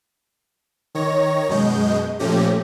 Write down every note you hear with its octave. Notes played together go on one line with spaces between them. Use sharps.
D#3 C#5 A#6
F#2 B2 G#3 D#5 G6
A#2 F3 A3 C#4 G4 A#6